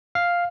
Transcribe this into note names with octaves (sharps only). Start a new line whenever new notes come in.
F5